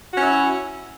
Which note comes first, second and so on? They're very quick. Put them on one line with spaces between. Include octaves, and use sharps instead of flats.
F#4 C#4 E4